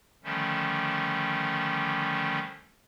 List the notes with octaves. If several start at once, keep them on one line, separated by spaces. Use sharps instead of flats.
D3 D#3 F3 G3 A3 C#4